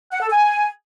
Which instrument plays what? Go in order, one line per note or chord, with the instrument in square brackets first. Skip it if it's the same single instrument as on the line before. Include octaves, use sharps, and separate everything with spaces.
[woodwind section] F#5
A4
G#5